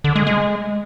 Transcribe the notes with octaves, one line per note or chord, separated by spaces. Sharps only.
D3
G#3
G#3